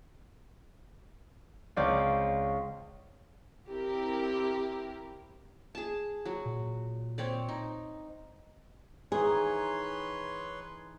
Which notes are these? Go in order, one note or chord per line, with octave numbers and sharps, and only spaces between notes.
C#2 C4 D5 F5
C4 E4 G4 A#4
G#4 A5
F#3
A#2
C4 C#5 D5
D#4
D#3 E3 D#4 G#4 B4 C#5 C6